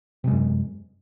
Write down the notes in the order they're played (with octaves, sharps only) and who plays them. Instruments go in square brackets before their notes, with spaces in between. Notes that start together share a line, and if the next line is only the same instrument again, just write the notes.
[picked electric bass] C3
G#3
F#2